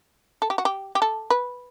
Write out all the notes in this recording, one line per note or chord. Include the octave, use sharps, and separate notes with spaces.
A4
G4
F#4
G4
G4
A4
B4